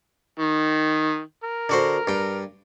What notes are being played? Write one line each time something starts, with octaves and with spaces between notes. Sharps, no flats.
D#3
A#4
D3 F#4 C5
G2 G5